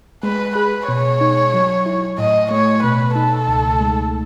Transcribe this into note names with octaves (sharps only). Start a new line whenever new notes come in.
G#3 B4
G#4 B4
B2 C#5
D#4
F#3
E4
A2 D#5
A3 C#5
B2 B4
D#4 A4
C#2
G#3